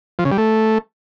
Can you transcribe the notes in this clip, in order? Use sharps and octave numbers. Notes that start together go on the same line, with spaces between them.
F3
C#3
G3
A3